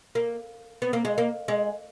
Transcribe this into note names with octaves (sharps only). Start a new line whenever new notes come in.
A#3
B3
A#3
G#3
A#3
G#3